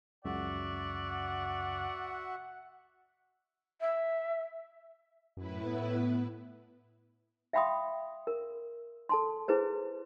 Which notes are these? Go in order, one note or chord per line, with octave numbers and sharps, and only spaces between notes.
C#2 F#2 C#3 F#4 D5 E5 F#5
E5
F#2 A2 E4 B4
B3
E5 F5 G5 B5 C6 D#6
A#4
A4 A5 C6
E4 G#4 B4 C5